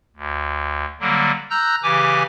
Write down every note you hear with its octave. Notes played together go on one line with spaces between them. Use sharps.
D2
D3 F#3 G3 A#3
A#5 E6 F#6 G6 A#6
C#3 E3 G4 G#5 D6